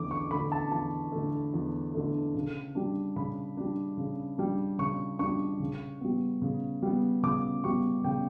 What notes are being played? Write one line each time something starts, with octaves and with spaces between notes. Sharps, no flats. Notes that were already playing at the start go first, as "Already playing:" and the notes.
Already playing: E2 D3 A3 D6
C#6
D3 A3 B5
A5
E2 A5
D3 A3
E2
D3 A3
C#3
G3 D4
C#3 B5
G3 D4
C#3
G3 D4
C#3 C#6
G3 D4 C#6
C#3
G3 B3
C#3
G3 B3
C#3 D6
G3 B3 C#6
C#3 G5